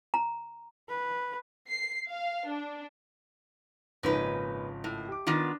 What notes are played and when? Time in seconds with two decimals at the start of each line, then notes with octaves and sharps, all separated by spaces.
0.14 A#5
0.89 B4
1.68 C7
2.10 F5
2.49 D4
4.03 G#1 A#2 C#3 F3 D#4 B4
4.84 A2
5.08 G4 D6
5.27 D#3 B3 D4 F4 D6 A#6